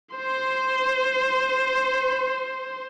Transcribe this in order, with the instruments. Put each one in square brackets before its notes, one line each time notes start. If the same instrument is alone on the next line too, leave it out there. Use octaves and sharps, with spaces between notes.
[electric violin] C5 C6